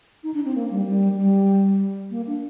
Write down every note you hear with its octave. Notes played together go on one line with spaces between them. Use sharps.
D#4
D4
C4
A#3
G3
G3
G3
A#3
D4